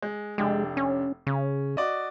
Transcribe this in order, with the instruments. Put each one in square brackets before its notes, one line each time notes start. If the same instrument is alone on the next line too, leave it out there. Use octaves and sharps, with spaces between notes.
[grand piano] G#3
[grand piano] F1 D4 G4 [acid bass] G#3
[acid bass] C#4
[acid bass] C#3 [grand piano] C#4
[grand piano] F#4 D5 D#5